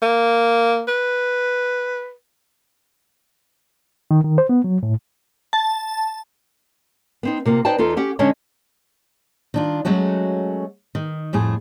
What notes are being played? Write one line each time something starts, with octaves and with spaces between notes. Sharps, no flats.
A#3
B4
D#3
D#3
C5
B3
F#3
A2
A5
B3 C4 D#4
C3 A#3 F4
D#4 B4 C5 D5 G5 A5
E2 D#4 F4 A4
C#4 G4 F#5
D3 G#3 C#4 D4 C#5 D#5
D#3 D4 F4
F#3 G#3 A3 C#4 F#4
D#3
F2 A2 A3 G#4